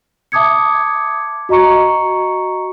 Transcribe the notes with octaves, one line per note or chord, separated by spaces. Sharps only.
E5 A5 D6 D#6 G#6 C#7
F#4 D#5 A#5 C#6 C#7